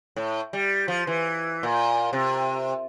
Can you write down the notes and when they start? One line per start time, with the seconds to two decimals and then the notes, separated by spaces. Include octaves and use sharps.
0.16 A2
0.53 G3
0.88 F3
1.07 E3
1.63 A#2
2.13 C3